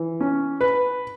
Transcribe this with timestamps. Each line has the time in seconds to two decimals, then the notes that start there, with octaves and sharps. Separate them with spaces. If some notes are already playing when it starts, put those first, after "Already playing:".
Already playing: E3
0.20 C#4
0.61 B4